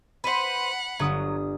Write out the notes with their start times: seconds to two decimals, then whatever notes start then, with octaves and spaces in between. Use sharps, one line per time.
0.24 B4 C5 F#5 B5
0.99 G1 F#3 D#6